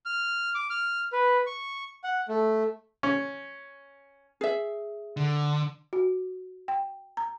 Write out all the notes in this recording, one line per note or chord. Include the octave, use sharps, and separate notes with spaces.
F6
D6
F6
B4
C#6
F#5
A3
C#4
G#4 E5
D3
F#4
G5
A#5